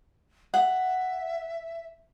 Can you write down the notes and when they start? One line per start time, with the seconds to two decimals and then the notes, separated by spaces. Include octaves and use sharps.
0.54 E5 F#5